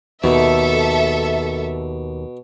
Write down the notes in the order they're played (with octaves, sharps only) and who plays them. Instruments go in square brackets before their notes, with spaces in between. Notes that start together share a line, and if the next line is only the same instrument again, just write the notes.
[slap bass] D#2 [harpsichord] B2 [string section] A4 E5